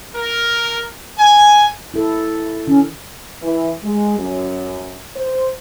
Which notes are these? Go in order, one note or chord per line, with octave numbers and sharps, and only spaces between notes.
A#4
G#5
E4 A4
D#3 C#4
E3
G#3
F#2
C5